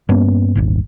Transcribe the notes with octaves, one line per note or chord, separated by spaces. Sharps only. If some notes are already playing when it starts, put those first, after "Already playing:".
G2 A#3 B3 C#4
D#1 G#1 G#2